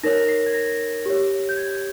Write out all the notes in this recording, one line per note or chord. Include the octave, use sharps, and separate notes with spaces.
D#4 A#4 C#5 A#6
C7
G#6
A#6
G4 C#5
G6
G#6